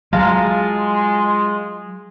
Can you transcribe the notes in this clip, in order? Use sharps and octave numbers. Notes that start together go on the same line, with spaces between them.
F#3 G#3 F4 F5 A5 A#5